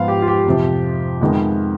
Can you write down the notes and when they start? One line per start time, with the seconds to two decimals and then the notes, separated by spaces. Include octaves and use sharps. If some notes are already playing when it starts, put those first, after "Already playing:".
Already playing: G#2 F3 B3 F4 F5
0.08 G4
0.22 F4
0.28 G4
0.46 F2 C3 F3
1.21 F2 D#3 G#3 B3